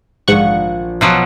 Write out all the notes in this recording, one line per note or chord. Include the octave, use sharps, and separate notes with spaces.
A#1 G#2 F3 F#5 C#6
B2 F3 F#3